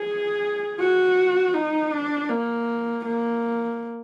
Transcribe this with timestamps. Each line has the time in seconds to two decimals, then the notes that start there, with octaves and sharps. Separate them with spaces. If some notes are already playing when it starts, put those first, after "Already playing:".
Already playing: G#4
0.80 F#4
1.54 D#4
1.93 D4
2.30 A#3
3.05 A#3